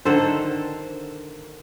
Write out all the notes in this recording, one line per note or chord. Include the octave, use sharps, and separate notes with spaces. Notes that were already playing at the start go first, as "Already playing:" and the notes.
D3 D#3 A4 C5